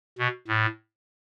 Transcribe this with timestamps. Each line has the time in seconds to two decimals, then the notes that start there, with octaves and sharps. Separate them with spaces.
0.19 B2
0.48 A2